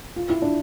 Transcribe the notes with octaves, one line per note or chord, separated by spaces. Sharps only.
F4
E4
D4